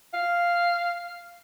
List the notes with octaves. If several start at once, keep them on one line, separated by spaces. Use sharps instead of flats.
F5